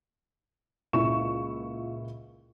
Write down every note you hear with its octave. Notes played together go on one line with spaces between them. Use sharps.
C#2 A#2 E4 C#6 E7